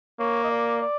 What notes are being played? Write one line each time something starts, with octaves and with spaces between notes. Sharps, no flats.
A#3 C#5
D#5
D5
D5